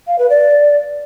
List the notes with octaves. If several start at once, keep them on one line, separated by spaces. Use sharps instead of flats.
F5
B4
D5